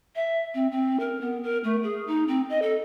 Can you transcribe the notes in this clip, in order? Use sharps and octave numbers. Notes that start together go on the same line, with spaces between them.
E5
C4
C4
A#4
B3
A#4
A3
G#4
D#4
C4
D#5
A4